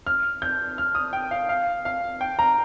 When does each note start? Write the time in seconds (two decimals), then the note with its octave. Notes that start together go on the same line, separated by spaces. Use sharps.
0.07 F6
0.42 G6
0.78 F6
0.95 D#6
1.13 G5
1.31 F5
1.49 F5
1.85 F5
2.21 G5
2.39 A#5